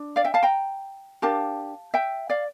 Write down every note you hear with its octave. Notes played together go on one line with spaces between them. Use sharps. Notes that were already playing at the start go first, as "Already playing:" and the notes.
Already playing: D4
D5 F5
E5 G5
F5 A5
G5 A#5
D4 G4 A#4 F5 A5
E5 G5
D5 F5